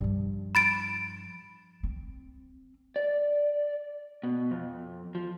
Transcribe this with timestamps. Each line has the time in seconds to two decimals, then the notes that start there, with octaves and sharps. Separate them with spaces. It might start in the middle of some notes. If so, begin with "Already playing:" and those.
0.01 G2 F3
0.55 B5 A6 D7
1.83 C4
2.96 D5
4.23 B2
4.51 F2
5.15 F3